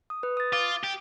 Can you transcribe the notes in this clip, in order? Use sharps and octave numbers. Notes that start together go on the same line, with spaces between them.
D#6
B4
D#6 A6
F4 D6
G4